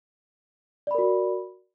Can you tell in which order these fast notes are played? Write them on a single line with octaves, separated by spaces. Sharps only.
D5 B5 A#4 F#4